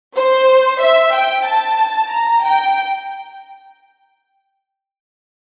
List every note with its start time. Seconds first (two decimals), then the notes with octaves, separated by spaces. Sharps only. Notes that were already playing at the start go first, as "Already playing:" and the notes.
0.17 C5
0.82 E5
1.15 G5
1.48 A5
2.13 A#5
2.47 G5